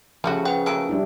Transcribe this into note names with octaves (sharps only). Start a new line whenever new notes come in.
C#3 F3 G3 A3 F#4
B4 F#5 G5
F#3 A3 A#3 G5 E6 D7
G3 D4 E4